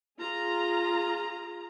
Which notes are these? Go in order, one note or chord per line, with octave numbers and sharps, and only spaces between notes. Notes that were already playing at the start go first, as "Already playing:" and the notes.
F4 G#4 A#5